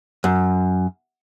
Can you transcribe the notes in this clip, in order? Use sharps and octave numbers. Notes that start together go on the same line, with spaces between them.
F#2